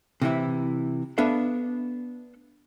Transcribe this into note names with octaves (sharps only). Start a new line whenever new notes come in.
C3 E3 E4
B3 D4 A4 E5 F5